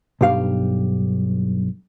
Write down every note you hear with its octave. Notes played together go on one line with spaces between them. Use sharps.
B1 G2 G4 F5